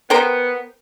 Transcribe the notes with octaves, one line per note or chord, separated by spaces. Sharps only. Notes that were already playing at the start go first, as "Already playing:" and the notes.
B3 A#4 C5 G5